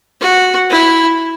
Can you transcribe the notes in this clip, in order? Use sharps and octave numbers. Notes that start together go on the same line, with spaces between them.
F#4
E4